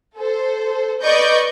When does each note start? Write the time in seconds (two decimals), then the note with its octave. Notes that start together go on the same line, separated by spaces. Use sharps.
0.18 A4 C5
1.03 B4 D5 D#5 C#6 G6